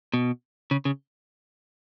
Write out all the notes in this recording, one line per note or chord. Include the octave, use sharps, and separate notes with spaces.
B2
C#3
C#3